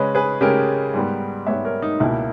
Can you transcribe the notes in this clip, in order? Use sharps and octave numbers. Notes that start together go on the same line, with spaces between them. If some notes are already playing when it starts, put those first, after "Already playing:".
Already playing: C#3 G#3 C#4 B4 D#5
G#4 B4
C#3 G#3 C#4 G4 A#4
G#2 G3 B3
G#2 G3 B3 C#5 E5
A#4 C#5
D#4
C#2 B2 A#3 E4